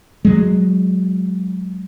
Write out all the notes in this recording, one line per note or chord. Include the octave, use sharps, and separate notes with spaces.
F#3 G#3